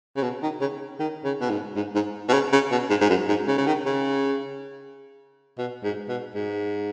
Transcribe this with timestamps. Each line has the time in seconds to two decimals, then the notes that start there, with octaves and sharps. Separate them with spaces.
0.16 C#3
0.23 B2
0.42 D#3
0.61 C#3
0.99 D#3
1.24 C#3
1.41 B2
1.50 G#2
1.76 G#2
1.95 G#2
2.29 B2
2.33 C#3
2.53 C#3
2.71 B2
2.90 G#2
3.01 G#2
3.10 F#2
3.28 G#2
3.47 C#3
3.58 C#3
3.67 D#3
3.86 C#3
5.58 B2
5.83 G#2
6.09 B2
6.35 G#2